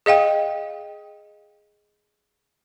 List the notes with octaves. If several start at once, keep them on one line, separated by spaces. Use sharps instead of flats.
G#4 D#5 F5 G5